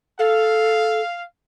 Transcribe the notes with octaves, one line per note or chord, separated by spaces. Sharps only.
A4 F5